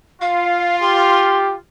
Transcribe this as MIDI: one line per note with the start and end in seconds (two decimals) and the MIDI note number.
0.21 1.58 65
0.21 0.76 77
0.82 1.54 67
0.82 1.38 84